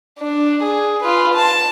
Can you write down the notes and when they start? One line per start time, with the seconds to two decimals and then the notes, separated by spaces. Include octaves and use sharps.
0.19 D4
0.63 G#4
1.03 F4 B4
1.34 A5